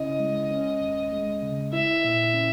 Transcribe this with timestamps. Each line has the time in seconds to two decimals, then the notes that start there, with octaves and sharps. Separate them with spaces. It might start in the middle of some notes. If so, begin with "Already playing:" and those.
Already playing: C#3 C#4 E4 D#5
0.19 G#3
0.51 C#4
0.81 D#2
1.12 G#3
1.42 C#3
1.73 E4 E5
2.04 A#2
2.34 C#4